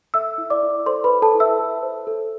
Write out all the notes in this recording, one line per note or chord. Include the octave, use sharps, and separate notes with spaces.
A4 E5 E6
E4
D5 D6
E4
A4 C5 C6
B4 B5
A4
A4 A5
E4
E5 E6
A4
C5
A4